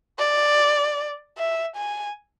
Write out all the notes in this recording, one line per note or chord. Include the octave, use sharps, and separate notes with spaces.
D5
E5
G#5